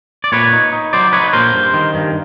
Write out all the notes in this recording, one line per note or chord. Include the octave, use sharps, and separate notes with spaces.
D5
A#2 B4 C#5
D#4
D#4
F#3 C5 D5
D#4 B4 C#5
A#2 A#4 C5
G2
D#3
G2